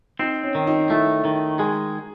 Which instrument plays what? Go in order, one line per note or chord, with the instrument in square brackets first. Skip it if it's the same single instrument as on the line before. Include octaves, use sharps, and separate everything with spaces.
[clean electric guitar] C4 [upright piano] D#4
[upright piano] C#4
[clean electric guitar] D#3
[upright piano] D#4
[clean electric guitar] A3 [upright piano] E4
[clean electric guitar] D#3
[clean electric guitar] G#3 [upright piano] G#4